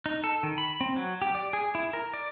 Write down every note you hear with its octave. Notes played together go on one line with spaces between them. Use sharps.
D#4
A4
D#3
B5
C4
F#3
G4
D5
G#4
E4
A#4
D5